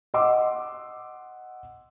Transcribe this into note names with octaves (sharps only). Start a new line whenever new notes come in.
D#5 F#5 C6 D6 E6